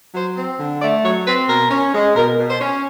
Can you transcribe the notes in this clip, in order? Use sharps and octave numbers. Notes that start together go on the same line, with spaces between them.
F#3 C5
C4
D3
A3 D5
F#3 C#5
C4 B4
B2 A#4
C#4
G#3
B2 A#4
B2
C5
C#4